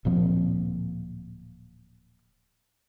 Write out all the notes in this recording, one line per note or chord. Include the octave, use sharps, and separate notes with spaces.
D1 A#2 F3 C4